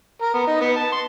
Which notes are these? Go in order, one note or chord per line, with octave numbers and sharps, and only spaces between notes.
A#4
B3
D#4
B3
A5
C6